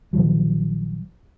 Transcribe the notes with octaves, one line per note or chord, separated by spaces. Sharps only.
A#1 D#3 F3 F#3